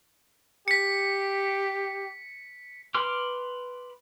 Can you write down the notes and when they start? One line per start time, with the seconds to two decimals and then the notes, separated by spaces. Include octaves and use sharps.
0.68 G4 B6 C#7
2.95 B4 C6 D6 F6